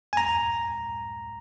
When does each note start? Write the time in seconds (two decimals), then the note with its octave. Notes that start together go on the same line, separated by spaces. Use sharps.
0.13 G#5
0.17 A#5